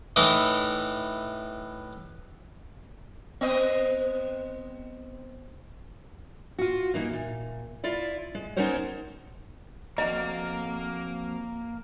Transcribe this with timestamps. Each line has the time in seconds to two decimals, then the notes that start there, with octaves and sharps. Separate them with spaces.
0.16 A2 E3 D#4
3.41 B3 C4 D#5
6.59 F4 F#4
6.94 E3 A#3 D#4
7.13 A#2
7.83 E4 F4 D5 F5
8.35 G#3
8.57 B3 C#4 D#4 A#4 C5 C#5
9.98 F2 A#3 F#4 A#4 D#5 A#5